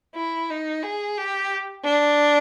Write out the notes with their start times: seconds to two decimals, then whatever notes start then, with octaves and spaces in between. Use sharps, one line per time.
0.15 E4
0.50 D#4
0.83 G#4
1.17 G4
1.85 D4